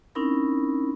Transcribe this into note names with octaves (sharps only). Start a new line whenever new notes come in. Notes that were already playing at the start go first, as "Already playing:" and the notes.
C4 C#4 D#4 E4 A#4 B5